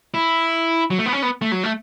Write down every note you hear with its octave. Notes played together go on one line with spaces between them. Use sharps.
E4
F#3
A3
B3
C#4
B3
A3
F#3
A3